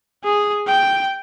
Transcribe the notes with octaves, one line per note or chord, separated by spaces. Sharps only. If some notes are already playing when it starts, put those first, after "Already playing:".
G#4
G5